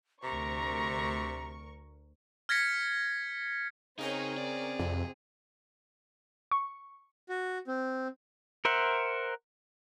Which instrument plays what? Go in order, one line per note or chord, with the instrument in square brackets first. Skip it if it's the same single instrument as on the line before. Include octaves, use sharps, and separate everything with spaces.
[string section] D2 A#4 C#6 [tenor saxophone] C3 [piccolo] A#5
[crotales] F6 G#6 A#6 B6 C#7
[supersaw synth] C#3 A#4 C#5 [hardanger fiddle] C4 G#4 [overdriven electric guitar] D#4
[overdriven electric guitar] D5
[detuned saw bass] F2 [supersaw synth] C3
[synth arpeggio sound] C#6
[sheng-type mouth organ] F#4
C4
[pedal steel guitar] A#4 C5 E5 F#5